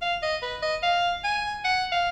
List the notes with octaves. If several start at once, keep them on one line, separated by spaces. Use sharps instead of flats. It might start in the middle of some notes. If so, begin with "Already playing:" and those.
F5
D#5
B4
D#5
F5
G#5
F#5
F5